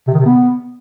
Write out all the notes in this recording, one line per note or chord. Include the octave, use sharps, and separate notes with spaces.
C3
D#3
C3
B3